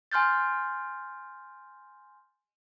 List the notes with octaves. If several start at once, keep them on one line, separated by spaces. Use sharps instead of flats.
G#5 C6 F6 G6 A6